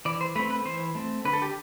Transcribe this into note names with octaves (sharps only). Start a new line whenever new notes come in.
E3 D5
C5
A3 C4 B4
B4
E3 C5
A3 C4
D3 B4
A4
G4